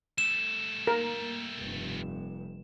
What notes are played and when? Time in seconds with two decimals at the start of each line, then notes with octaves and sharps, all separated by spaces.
0.18 G3 A3 E7
0.87 A#3 A#4
1.58 F1 G2